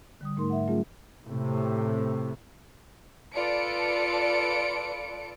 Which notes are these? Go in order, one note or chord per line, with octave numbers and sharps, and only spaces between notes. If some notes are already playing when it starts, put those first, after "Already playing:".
D3 G3 D#6
G#2 A3 D#4 A#4 C6
E5 F#5
F#3 A3 C#4 F4 G#4
A2 C3
F4 A4 B4 D5 C#7 D7